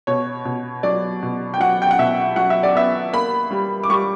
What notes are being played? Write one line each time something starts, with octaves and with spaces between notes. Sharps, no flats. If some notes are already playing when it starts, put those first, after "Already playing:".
B2 C#5
B2
F#3 D5
B2
G5
F#3 F#5
G5
F#5
B2 E5
F#3 F#5
E5
D5
B3 E5
A#3 B5
G3
D6
G3 C#6